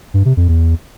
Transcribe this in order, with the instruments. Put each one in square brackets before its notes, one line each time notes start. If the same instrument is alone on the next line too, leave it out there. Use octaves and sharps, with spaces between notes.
[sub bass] G2
C3
F2
E2